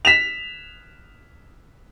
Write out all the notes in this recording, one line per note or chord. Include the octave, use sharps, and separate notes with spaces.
B6 E7 F7